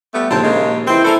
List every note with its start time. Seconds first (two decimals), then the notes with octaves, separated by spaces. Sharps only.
0.14 G3 A3 B3
0.31 A#1 D#2 D3 C4 A5
0.44 C#3 G#3 A#3
0.88 E3 C4 C6
1.05 D4 E4 A4 G#5 A#5